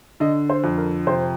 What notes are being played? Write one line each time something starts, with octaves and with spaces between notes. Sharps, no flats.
D3 D#5
C5
F2
A#4
C3 C5